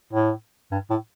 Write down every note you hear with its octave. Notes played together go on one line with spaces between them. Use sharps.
A2
G2
A2